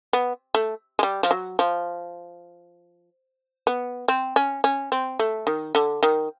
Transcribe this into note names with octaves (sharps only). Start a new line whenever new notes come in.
B3
A3
G#3
G3
F3
F#3
F3
B3
C4
C#4
C#4
C4
A3
D#3
D3
D#3